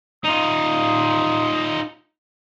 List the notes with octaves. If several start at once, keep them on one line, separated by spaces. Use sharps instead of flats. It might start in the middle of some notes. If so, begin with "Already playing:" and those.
D#4 F4 D#6